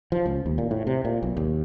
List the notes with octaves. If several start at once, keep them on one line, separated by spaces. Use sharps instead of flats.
F3
C#2
D#2
A#2
A2
C3
A#2
B1
D#2